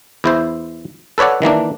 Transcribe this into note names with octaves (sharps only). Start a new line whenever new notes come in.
E2 E4 C5
A4 B4 C#5 D5 F#5
D#3 E3 A#3 D4